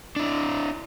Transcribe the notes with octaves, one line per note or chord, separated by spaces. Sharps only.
D4 E4